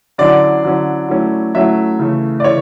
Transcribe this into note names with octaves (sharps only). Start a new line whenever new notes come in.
D3 F#3 C#4 E4 D5
D3 F#3 C#4 E4
F#3 A3 C#4 E4
F#3 A3 C#4 E4 E5
C#3 E3 A3
D5
C#3 E3 C#5